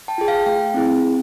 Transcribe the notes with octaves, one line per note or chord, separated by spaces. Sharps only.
G5 A5
F4 G#4
F5 G5
A3 F5 G5
C4 E4 G#4
C4